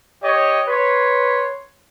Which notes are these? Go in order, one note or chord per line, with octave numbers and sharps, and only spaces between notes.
G4 C#5 D#5
B4 C#5 C6